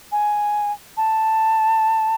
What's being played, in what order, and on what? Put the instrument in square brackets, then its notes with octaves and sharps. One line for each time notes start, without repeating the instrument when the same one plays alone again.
[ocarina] G#5
A5